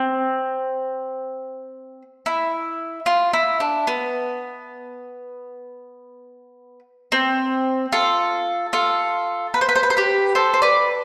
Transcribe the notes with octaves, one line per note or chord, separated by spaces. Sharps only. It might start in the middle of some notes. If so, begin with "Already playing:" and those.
Already playing: C4
E4
F4
E4
D4
B3
C4
F4 A4
F4 A4
B4
C5
B4
C5
B4
C5
G4 B4
A4 C5
C5
B4 D5